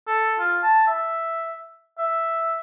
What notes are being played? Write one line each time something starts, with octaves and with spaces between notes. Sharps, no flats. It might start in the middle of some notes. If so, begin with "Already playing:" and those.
A4
F4
A5
E5
E5